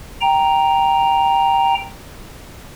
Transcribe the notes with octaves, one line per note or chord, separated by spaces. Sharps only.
G5 A#5